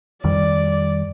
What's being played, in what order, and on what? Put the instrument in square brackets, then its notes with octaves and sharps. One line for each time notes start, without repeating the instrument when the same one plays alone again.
[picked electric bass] F2 D#3 G3 [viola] D5